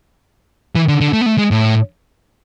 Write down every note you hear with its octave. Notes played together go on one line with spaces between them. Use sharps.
E3
D3
D3
A3
B3
A3
G#3
A2